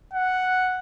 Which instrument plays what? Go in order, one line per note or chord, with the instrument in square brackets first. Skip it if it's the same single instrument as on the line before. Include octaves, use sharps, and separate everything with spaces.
[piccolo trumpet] F#5